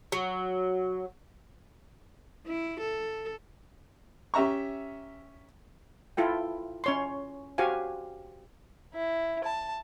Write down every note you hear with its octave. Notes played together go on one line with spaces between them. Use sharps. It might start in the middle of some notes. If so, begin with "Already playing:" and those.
F#3
E4
A4
C#4 G4 E5 A#5 C#6
E4 F4 A4 G5
C#4 C#5 C6
F#4 G4 C5 F5 G#5
E4
A5